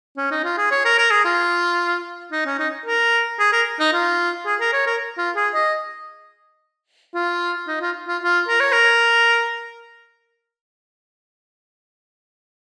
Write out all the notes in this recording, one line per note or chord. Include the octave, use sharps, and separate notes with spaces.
C#4
D#4
F4
G#4
C#5
A#4
A#4
G#4
F4
D#4
C#4
D#4
A#4
G#4
A#4
D#4
F4
G#4
A#4
C#5
A#4
F4
G#4
D#5
F4
D#4
F4
F4
F4
A#4
C#5
A#4